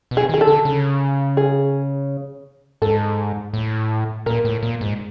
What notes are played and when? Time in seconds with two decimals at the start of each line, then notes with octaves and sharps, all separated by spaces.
0.11 B2
0.17 G#4
0.29 D#3 G#4
0.41 A4
0.47 D3
0.65 C#3
1.37 G#4
2.82 G#2 A4
3.53 A2
4.26 A#2 A#4
4.45 A2
4.63 A#2
4.81 G#2